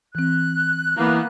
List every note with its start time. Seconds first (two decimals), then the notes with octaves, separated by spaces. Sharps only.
0.15 E3 C4 F#6
0.97 E3 A#3 B3